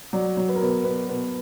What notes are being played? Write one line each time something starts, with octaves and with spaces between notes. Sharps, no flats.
F#3 D5
F#3
B4
A#4
B2 B4
B2 B4
B2 B4